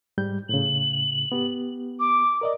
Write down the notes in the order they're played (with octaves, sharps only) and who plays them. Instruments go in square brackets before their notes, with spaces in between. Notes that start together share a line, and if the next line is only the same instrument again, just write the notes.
[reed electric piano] G#2 G3 G6
[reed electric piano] A2 C#3 [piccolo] F#7
[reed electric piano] B3 G4
[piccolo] D6
[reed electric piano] A#4 D5 D#5